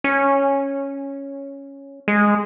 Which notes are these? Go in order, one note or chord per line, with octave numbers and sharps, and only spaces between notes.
C#4
G#3